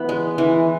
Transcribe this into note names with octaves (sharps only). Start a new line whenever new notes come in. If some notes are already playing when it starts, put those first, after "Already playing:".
Already playing: E3 B3
G#3
E3